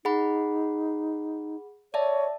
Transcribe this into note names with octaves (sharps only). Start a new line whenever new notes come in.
D#4 G#4 F#5 B5
C#5 D5 E5 A5